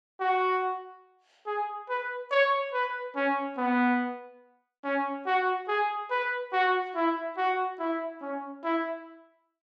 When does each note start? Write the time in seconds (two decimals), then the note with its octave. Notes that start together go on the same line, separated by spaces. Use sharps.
0.20 F#4
1.47 G#4
1.89 B4
2.31 C#5
2.73 B4
3.16 C#4
3.57 B3
4.84 C#4
5.26 F#4
5.68 G#4
6.11 B4
6.53 F#4
6.95 E4
7.37 F#4
7.79 E4
8.21 C#4
8.64 E4